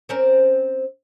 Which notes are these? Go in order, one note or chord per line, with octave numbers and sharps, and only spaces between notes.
C4 C#4 A#4